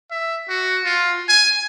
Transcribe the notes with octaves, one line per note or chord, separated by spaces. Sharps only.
E5
F#4
F4
G#5